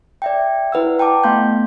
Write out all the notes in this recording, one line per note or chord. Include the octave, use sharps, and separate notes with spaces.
D5 E5 G5
E4 B4 F#5 E6
F#5 G5 A5 A#5 D6
A3 B3 F5 C6 G6